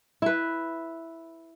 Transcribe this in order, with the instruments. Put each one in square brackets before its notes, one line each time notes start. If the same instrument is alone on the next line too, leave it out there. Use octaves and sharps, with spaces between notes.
[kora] E4 B4